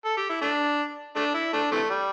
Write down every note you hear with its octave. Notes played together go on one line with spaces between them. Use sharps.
A4
G4
E4
A3 D4
A3 D4
E4
A3 D4
C3 E3 A3
G3